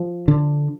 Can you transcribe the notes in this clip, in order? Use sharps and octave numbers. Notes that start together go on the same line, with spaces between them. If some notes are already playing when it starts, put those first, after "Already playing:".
Already playing: F3
D3